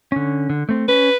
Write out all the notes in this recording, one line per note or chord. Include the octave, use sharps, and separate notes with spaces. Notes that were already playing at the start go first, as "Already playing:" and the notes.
D3 C#4
D3
A3 C4
C#4 B4